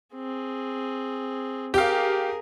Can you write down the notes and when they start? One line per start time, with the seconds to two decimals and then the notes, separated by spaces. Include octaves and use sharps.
0.15 C4 G#4
1.74 G4 G#4 A#4 F5